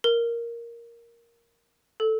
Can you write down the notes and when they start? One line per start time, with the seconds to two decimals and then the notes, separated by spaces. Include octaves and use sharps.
0.04 A#4
2.00 A4